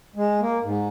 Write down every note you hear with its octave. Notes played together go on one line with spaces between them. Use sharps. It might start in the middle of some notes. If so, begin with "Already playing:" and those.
G#3
A#3
G#2